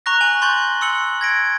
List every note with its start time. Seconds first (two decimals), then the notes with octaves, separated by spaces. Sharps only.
0.06 A#5 C#6 F#6 A#6
0.21 G#5 F#7
0.42 C6 C#6 G6 A6 F#7 G7
0.81 C6 E6 C#7 F#7
1.21 G#6 A#6 D7